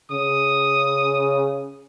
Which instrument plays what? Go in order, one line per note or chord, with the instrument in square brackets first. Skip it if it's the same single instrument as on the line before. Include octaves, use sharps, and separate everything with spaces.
[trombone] C#3 [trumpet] D#6